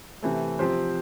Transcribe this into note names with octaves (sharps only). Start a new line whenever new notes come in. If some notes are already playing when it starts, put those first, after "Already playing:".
C3 E3 A3
C3 F3 C4 G4 C5